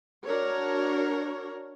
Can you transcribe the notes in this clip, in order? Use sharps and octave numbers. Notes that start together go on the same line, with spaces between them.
D4 F#4 A#4 C#5